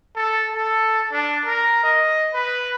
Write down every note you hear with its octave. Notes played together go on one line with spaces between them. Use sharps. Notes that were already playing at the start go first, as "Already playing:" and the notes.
A4
A4
D4
A#4
D#5
B4